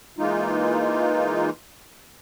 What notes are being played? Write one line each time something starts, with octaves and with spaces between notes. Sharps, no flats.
E3 G#3 A#3 D#4 F4